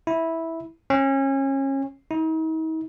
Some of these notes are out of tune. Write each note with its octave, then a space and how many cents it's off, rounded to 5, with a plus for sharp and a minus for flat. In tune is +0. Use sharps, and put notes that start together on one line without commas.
E4 -10
C#4 -30
D#4 +45